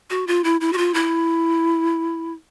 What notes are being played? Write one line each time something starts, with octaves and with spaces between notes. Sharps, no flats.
F#4
F4
E4
E4
F#4
F4
E4